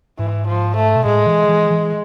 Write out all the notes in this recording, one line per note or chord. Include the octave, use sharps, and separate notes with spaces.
G#2 E3
F3
A3
B2
A2 G#3
E3
E3
E3